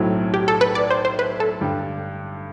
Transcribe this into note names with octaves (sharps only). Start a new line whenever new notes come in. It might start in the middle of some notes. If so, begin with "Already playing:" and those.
Already playing: B1 A2 F#3 A3 C4
G4
A4
B4
D5
C5
C5
B4
A4
G2 D3 G3